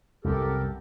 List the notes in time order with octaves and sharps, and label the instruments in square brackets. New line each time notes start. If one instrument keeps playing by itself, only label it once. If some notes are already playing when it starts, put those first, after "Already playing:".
[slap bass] C2 F#2 [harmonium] G4 A4 A#4